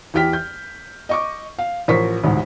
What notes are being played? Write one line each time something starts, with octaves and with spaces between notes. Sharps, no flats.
E2 E3 G4 G5 F6 B6
G6
D#5 C#6 D6
F5
A1 F3 A#4 C5 C#6 B6
D#1 A1 D2 G#2